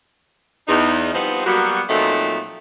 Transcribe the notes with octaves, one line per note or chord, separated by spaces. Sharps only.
E2 D#4
F3 G3 B3 C4 D#4
F#3 G3 A#3 B3 F#4
A#2 F3 F#3 A3 C4 D#4